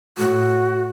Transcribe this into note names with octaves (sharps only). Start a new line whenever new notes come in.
A2 F#4